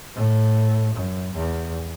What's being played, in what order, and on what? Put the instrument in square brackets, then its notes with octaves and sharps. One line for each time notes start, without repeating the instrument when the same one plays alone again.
[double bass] A2
F#2
E2